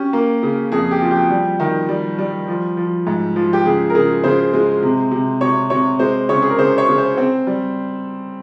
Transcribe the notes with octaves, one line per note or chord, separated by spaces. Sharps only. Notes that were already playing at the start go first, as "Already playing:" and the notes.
Already playing: C#4 G4
A#3
C#3
F2 G#4
G4
F3
G4
G3
D#3
G3
G3
F3
F3
G#2
F3
G4
C#3 G#4
A#4
C#3 G#4
C#3 C5
G#3
C3
C3
C3 C#5
C3 C#5
G#3 C5
C#3 C#5
G#4
A#4
C#3 C5
C#5
C#3
C5
C4
G3